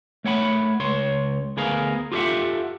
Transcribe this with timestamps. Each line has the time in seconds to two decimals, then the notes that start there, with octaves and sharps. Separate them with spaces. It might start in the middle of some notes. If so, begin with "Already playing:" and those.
0.25 A3 C#5 F#5 B5
0.80 C#2 C#5 C6
1.57 D2 B3 G#4 A#4 F5
2.12 F4 G4 A4 C#5 E5 F#5